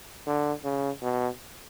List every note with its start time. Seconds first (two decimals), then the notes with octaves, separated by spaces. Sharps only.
0.27 D3
0.64 C#3
1.02 B2